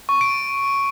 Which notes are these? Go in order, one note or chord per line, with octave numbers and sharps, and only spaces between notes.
C#6
D7